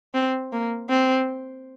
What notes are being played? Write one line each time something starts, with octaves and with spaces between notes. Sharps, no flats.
C4
A#3
C4